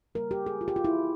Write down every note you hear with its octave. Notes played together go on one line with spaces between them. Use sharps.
C#3 G3 A#3 A#4
G4
G#4
F4
G4
F4
E4